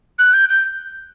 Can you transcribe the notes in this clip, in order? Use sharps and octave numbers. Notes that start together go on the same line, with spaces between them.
F#6
G6
G6